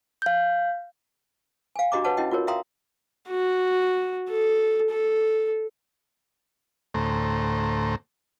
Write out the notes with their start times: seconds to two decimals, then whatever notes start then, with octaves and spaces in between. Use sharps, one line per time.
0.22 F5 G6
1.76 F5 G#5
1.92 D4 F#4 G4 D#5 A#5 D6
2.04 B4 C#5 F#5 A5
2.17 C#4 E4 F#4 D#5 G5
2.31 F4 F#4 A#4 C#5
2.47 E5 F5 G5 A#5 C6 D#6
3.29 F#4
4.31 A4
4.91 A4
6.94 D2 A2 A3 C5 A#5